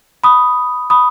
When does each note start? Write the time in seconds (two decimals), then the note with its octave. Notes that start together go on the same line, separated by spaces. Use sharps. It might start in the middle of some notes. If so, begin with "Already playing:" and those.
0.24 B5 D#6
0.90 B5 D#6